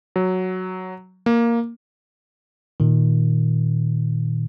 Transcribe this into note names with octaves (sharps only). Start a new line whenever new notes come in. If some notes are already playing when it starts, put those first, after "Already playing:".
F#3
A#3
A#2 D#3